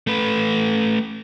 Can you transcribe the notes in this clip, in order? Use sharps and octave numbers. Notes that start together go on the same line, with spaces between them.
A3 B4